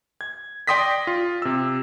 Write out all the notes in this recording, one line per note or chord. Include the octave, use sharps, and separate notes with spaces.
G#6
D5 G5 C6 D#6 A#6 B6
F4
C3 E6